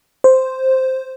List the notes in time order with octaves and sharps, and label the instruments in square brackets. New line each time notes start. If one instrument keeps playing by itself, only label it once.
[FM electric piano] C5